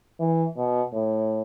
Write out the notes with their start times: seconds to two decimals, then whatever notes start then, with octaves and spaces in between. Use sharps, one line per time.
0.20 E3
0.57 B2
0.94 A2